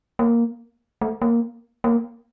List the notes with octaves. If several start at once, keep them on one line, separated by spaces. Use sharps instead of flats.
A#3
A3
A#3
A#3